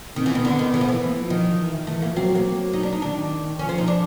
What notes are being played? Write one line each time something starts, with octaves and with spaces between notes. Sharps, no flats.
D#3 C4
E3
D#3 B3
D3
D#3
E3
F3
E3
A#3
F3
D#3
F3
E3
D#3
E3 A3
A#3
F3
F#3 C4
A#3
F#3
D#4
D4
D#4
D#3 D4
F3 C#4
C4
D#4
D4